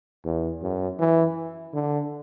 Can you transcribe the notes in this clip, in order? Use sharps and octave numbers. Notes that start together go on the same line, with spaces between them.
E2
F#2
E3
D3